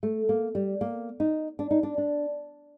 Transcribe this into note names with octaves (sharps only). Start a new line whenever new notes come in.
A3
A#3
G3
A#3
D#4
D4
D#4
D4
D4